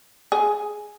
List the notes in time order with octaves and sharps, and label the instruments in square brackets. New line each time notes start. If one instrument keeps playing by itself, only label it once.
[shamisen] G#4